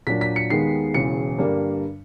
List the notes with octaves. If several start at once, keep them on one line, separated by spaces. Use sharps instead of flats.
A#2 F#3 A#3 D4 B6
B6
C#7
D#2 D#3 G#3 B3 C7
E1 E2 C#3 C#7
G2 D3 G3 A#3 D4